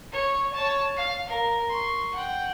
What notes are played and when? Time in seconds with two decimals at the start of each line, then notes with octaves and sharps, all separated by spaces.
0.12 C#5
0.54 C#5 A5
0.96 F5
1.28 A#4
1.69 C6 C#6
2.14 F#5 G5